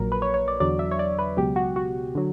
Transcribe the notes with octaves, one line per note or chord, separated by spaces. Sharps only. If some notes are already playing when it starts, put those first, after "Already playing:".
Already playing: A#1 A#2 F#3 A#4
B4
C#5
C#5
D5
E2 D3 F#3 D5
E5
C#5
D5
B4
C#2 B2 F#3 G4
F#4
F#4
D3 F#3